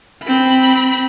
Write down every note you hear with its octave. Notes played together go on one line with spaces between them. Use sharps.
C4 B5